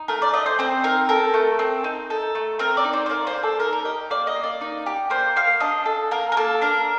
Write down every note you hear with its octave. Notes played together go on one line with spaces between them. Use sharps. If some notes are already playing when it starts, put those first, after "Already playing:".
Already playing: D#4
A3 A#4
D5
A3 D#5
C5
C4 C5
D#4 A#4
A4 A#4
A3
C4
D#4
A4
A3
C4 A#4
D5
D#4
C5
C5
A#3 D5
C5
A#3
A4
D#4 A#4
A#4
G4 D#5
A#3 D5
D#5
A#3
D5
D#4
G4
A#3 C5
A#3 F5
D4 D#5
A4
A#3 A#4
A#4
A#3 A4
D4 A#4